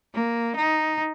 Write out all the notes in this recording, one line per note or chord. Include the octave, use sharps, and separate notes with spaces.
A#3
D#4